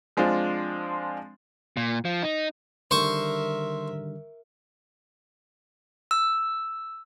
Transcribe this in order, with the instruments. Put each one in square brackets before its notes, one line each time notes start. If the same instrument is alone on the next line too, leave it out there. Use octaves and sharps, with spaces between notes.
[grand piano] F3 G#3 C4 D4 F4
[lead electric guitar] A#2
F3
D#4
[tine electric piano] D3 D#3 G3 [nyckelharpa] A#4 E5 [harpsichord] C5 C#6
[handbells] E6